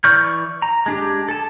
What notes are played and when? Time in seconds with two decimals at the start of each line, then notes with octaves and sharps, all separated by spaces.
0.04 E3 D5 C#6 F6 G6
0.62 A#5
0.86 G#3 D4 G4
1.28 A4 A5